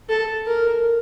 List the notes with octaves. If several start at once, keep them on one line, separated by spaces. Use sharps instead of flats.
A4
A#4